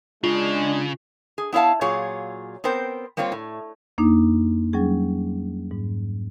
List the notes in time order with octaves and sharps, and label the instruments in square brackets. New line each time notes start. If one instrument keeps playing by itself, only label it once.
[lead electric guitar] C#3 [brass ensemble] G#3 D4 [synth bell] F4
[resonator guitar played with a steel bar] G#4
B3 E4 C#5 F5 A5
A#2 F#3 F4 G#4 C#5
B3 C4 A#4 C5 G5
G3 A#3 C4 F4 C#5
A2
[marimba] F2 A#3 D4 D#4
F#3 G3 C#4 G#4
G#2